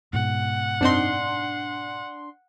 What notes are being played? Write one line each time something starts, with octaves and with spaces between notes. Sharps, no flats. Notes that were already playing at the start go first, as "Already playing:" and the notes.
G#2 B2 F#5
F#2 C4 D4 D#4 C6